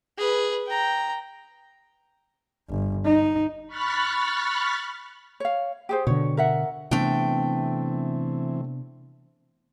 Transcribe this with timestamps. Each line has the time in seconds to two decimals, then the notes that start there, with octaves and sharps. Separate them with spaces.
0.18 G#4 B4
0.67 G5 A#5
2.69 G1
3.05 D#4
3.67 B5 C#6 F6 F#6 A6 B6
5.40 C#5 F5
5.89 G4 G#4 C5
6.07 B2 D3 C#5
6.37 A#4 E5 F#5
6.91 C3 E3 A3 B3 C4 D4 G5